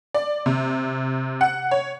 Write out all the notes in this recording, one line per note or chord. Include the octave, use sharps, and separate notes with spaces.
D5
C3
F#5
C#5